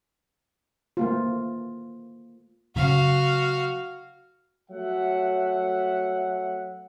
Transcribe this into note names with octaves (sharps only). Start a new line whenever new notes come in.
A3 A#3 F4
C#3 F#3 F#4 F5
F#3 A3 C#5 E5 F#5